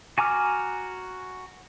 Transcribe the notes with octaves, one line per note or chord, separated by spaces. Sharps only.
F#4 G#5 A#5 D6 F6